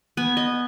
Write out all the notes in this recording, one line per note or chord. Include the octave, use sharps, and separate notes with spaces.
B3 G#5
D#5